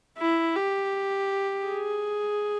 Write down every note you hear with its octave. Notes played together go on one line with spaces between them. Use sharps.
E4
G4
G#4